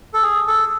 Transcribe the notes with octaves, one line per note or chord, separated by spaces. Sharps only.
A4
G#4
A4